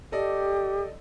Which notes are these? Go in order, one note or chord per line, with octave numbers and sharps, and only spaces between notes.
G4 A4 D5 D#5